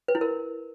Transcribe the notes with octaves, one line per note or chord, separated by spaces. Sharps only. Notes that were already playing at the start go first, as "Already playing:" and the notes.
B4
E4
A#4